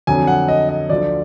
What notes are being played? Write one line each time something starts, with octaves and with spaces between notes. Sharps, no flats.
F2 D3 F#3 G#5
F#5
D#5
D#5
D2 D3 F3 D5